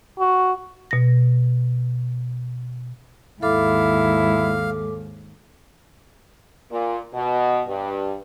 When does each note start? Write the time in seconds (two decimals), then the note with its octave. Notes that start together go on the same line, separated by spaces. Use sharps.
0.19 F#4
0.91 B2 A#6
3.42 D#2 G#2 E4 A4 F5 D6
6.71 A#2
7.14 B2
7.67 G2